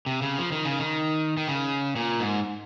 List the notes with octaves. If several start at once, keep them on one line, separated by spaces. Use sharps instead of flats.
C3
C#3
F3
D#3
C#3
D#3
D#3
C#3
A#2
G#2